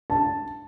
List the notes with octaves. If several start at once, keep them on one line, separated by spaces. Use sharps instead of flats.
A5